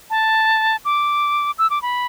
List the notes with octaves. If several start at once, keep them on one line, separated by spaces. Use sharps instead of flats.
A5
D6
E6
D6
B5